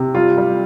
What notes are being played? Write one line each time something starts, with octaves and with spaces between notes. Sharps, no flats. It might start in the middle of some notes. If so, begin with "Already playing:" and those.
Already playing: C3
G3 F4
G3